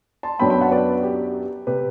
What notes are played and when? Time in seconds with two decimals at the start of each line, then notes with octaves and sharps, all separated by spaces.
0.23 A5 C6
0.39 F#2 F#3 B3 D4 G5 B5
0.50 G5 B5
0.61 F#5 A5
0.71 B4 D5
1.03 G4
1.67 C3 G4 B4